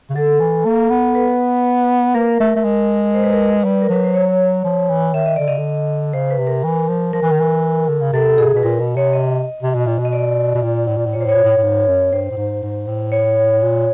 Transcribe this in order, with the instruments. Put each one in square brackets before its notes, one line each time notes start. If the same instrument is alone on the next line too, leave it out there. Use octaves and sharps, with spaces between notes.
[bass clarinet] C#3
[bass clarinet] D3 [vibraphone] A4
[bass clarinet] E3
A#3
B3
[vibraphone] B4
[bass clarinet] A#3 [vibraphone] A#4
[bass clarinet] A3
A3
G#3
[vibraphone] C5
B4
A#4
B4
[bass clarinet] G3
[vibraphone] A#4
[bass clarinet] F#3 [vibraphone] B4
[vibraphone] C5
C#5
[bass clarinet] F3
E3
[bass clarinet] D#3 [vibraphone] E5
[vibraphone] D#5
[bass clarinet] D3 [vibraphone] D5
[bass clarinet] C#3 [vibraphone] D#5
[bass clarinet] D3
[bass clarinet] C#3 [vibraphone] C5
[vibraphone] B4
[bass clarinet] C3
[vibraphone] A#4
[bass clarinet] E3
F3
[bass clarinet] F3 [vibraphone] A#4
[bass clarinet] E3
D#3
E3
D3
C#3
[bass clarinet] C3 [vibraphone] A4
[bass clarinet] B2 [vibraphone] G#4
[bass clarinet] C3
[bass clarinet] B2 [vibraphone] B4
[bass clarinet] A#2 [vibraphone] A#4
[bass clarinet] B2
[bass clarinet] C3 [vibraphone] C#5
[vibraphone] D#5
[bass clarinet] C3
B2
A#2
B2
[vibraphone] D#5
D5
[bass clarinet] B2
A#2
A2
A#2
A2
[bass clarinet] A#2 [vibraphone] C#5
[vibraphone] C5
[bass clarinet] A2 [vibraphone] C#5
[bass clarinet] A#2
A2
A2
G#2
F#2
[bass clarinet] G2 [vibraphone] C5
[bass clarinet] A2
G#2
G#2
A2
[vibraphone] C#5
[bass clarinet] A#2